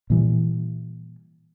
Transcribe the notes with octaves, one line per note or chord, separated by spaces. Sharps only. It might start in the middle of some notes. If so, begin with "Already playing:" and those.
A#2 E3 G3